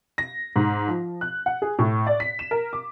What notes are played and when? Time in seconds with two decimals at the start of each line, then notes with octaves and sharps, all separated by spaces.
0.18 A#6
0.56 G#2
0.87 F3
1.21 F#6
1.46 F#5
1.62 G#4
1.79 A2
2.07 D5
2.20 B6
2.39 E7
2.51 A#4
2.73 D6